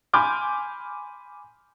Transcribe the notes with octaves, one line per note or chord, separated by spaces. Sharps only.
G#5 B5 C6 D6 F6 G6